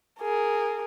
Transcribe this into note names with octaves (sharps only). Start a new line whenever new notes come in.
G#4 A#4